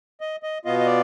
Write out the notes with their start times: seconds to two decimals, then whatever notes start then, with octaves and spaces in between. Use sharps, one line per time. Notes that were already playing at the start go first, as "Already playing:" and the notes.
0.21 D#5
0.43 D#5
0.65 B2 B3 F4 D#5
0.79 D#5
0.87 D5